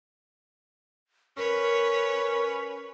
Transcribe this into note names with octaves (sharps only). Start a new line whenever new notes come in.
C#4 A#4 B4 C#5